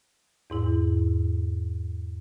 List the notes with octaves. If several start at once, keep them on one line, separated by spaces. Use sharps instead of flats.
E2 G#2 E4